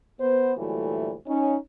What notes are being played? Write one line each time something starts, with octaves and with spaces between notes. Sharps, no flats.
B3 C5
D2 A#2 E3 F#3 G3 A3
C#4 D#4